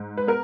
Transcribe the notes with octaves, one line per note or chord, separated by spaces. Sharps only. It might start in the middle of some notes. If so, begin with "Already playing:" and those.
Already playing: G#2
B4
B3 A#4